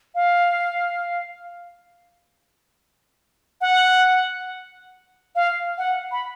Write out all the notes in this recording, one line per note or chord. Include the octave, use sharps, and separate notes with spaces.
F5
F#5
F5
F#5
B5